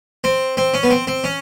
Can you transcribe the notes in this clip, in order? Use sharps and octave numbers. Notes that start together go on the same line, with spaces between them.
C4
C4
C#4
B3
C4
C4
C#4